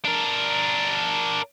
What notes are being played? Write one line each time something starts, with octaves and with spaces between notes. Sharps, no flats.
D4 A#4